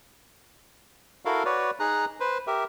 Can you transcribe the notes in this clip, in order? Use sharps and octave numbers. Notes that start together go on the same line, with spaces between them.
E4 F#4 A4 A#4 F5
F#4 B4 C#5 D5
D#4 G#4 A#5 F#6
B4 C5
G4 A#4 E5